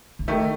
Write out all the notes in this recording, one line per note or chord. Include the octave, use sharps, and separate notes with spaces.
D3
D#3 A3